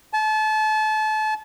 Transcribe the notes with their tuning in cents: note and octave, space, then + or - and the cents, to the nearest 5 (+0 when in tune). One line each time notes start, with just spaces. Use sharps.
A5 -30